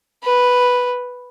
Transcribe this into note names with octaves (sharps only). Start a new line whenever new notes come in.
B4